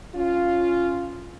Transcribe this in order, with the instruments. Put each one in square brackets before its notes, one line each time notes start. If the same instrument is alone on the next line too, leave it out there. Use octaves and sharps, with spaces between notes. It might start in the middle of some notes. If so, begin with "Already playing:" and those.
[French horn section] C#4 F4